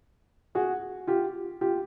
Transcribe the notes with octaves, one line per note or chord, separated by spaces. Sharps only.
F#4 G#4
F4 G4
F4 G4